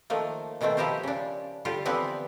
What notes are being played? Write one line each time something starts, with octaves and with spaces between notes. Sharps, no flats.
D#3 F3 A3 A#3
B2 D#3 G#3 A3 C4
F3 E4 G4 A#4 C5
C#3 D4
D3 G3 F4 G4
D3 E3 F3 B3 C4 E4